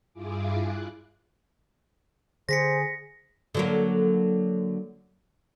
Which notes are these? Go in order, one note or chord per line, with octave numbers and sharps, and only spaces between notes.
G2 E4 F4 G#4 D6
F#6
D3 G#4 C5 A#6 B6 C#7
D3 F#3 A#3